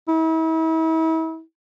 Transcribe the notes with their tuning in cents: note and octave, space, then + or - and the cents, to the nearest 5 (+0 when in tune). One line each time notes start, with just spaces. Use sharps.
E4 -40